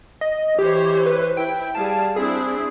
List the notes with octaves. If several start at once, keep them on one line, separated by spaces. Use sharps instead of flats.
D#5
E3 G4 C5 C#5
B4
E4 G5
G3 G#4 F5 A5
C4 D4 E4 G#4